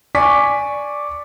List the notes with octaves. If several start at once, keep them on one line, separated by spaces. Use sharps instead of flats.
D5 G#5 C#6 D6 B6